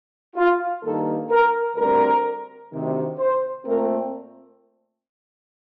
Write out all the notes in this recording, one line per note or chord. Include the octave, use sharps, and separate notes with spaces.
F4
G2 D#3 A#3 A4
A#4
D2 D3 G3 C4 A#4
D2 C3 D#3
C5
A#2 A3 C4 A#4